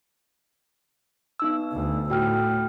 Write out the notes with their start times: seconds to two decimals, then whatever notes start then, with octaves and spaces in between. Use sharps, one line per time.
1.40 B3 D#4 E6
1.72 D2
2.10 A2 F#4 G5 F6